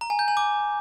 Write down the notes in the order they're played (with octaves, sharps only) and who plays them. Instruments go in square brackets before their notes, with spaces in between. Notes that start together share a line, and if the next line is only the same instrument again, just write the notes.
[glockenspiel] A#5
G#5
G6
G#5
D6